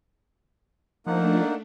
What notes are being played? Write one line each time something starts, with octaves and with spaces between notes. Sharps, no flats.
F3 A3 A#3 D4 D#4 F#5